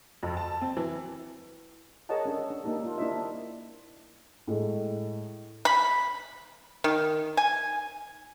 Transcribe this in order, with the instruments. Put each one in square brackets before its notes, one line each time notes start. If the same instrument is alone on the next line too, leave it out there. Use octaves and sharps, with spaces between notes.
[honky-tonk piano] F2
A5
C4
E3
[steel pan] G#4 A#4 C#5 D#5 F#5 A5
C#4 D4 A4
D4
A#3 D4 D#4 G4 A4
F4
A#3 D4 E4 C5 D#5 E5
[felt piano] A2 G#3
[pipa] B5
D#3
G#5